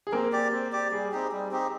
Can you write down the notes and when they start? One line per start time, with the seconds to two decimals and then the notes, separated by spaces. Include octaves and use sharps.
0.07 G#4
0.12 A#3 C4 A#4
0.32 G4 D5
0.52 C4
0.72 G4 D5
0.92 G3 G#4
1.12 C4 D#4 G4
1.32 G3
1.51 C4 D#4 G4